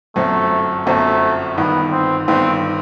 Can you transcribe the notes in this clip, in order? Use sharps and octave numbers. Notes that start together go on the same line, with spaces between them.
G1 F#2 F#3 A3 C4
G1 F#2 F#3 A3 C4
G1 G2 D#3 B3
C4
G1 G2 D#3 C4